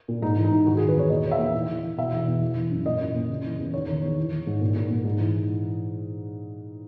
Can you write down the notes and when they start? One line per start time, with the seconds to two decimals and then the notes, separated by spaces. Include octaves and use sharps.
0.08 A#2
0.22 G#2 D#4
0.36 E3
0.44 D#4
0.52 G#2
0.67 D#3 F#4
0.77 G#4
0.81 D#3
0.88 B4
0.96 E2 C#5
1.10 A#2 D#5
1.25 A#2
1.32 E5
1.39 A#2
1.54 E3
1.69 E3
1.83 E3
1.97 B2 E5
2.12 E2
2.27 E2
2.41 E3
2.56 E3
2.71 F#2
2.86 A#2 D#5
3.01 A#2
3.15 A#2
3.30 C#3
3.44 E3
3.59 E2
3.74 D#3 C#5
3.88 D#3
4.03 E2
4.18 E3
4.33 E3
4.47 G#2
4.61 A#2
4.76 A#2
4.90 A#2
5.05 G#2
5.20 E3